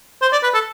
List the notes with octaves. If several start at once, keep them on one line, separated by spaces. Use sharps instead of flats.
C5
D5
B4
A4